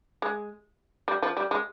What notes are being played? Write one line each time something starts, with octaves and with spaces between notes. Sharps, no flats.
G#3
G3
F3
G3
G#3